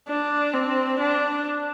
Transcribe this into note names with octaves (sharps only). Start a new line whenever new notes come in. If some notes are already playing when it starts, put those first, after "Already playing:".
D4
C4
D4